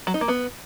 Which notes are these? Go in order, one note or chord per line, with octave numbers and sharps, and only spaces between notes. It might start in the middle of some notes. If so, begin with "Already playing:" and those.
F#3
D#4
A#3
B3